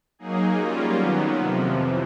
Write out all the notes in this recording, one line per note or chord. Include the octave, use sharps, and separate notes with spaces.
F#3 A#3 D#4 G#4
G3 A#3 C#4 F4
D#3 F#3 B3
F2 C3 F3
E3